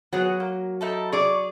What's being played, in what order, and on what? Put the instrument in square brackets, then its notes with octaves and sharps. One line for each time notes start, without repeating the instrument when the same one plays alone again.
[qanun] F#3 [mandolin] B3 G#4 F#5
[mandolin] A#3
D#4 E4 A4
[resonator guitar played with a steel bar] G#4 D5 [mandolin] C#6